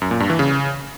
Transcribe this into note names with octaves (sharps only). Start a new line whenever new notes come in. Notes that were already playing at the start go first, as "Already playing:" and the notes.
F#2
A#2
G2
E3
C#3